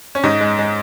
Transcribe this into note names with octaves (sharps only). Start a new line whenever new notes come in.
C#4
G#2 D#4
G#3
G#3